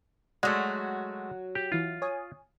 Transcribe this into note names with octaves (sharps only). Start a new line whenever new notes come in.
F#3 G#3 A3 F#4 D5 C6 C#6
G4
E3 E4 F4
C#5 G#5 D#6